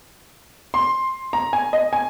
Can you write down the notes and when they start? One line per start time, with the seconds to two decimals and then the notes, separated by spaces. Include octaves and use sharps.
0.74 C6
1.33 A#5
1.53 G#5
1.73 D#5
1.93 G#5